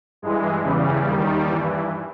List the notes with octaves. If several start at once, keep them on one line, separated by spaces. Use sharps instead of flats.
G2 E3 G#3
E2 C#3 E3 G3
D#2 D#3
G2 E3